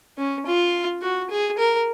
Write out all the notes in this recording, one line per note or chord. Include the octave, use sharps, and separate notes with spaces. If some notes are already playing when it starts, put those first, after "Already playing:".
C#4
F4
F#4
G#4
A#4